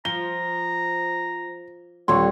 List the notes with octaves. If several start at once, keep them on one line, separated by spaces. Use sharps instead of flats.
F3 A#5 G7
D#1 D3 G3 C4 C#5 C6 C#6